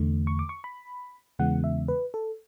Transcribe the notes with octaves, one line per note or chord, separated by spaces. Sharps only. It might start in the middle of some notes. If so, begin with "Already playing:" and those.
Already playing: E2 D3 A3
C#6
D6
C#6
B5
E2 C#3 E3 G#3 B3 F#5
E5
B4
A4